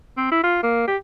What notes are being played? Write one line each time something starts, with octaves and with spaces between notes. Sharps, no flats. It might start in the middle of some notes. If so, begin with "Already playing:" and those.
C4
E4
F4
A#3
G4